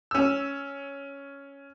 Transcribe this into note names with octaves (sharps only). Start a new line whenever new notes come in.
C#4 E6